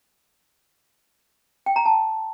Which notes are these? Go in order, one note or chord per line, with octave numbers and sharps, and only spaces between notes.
G5
A#5
A5